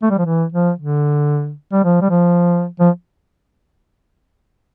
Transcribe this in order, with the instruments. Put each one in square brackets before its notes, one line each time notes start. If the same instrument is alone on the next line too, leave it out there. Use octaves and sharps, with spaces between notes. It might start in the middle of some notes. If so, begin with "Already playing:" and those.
[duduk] A3
G3
F3
E3
F3
D3
G3
F3
G3
F3
F3